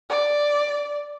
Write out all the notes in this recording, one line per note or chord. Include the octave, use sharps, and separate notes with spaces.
D5